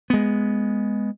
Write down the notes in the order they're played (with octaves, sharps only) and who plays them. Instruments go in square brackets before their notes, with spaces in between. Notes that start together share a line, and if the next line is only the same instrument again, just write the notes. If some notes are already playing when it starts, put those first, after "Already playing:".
[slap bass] G#3 B3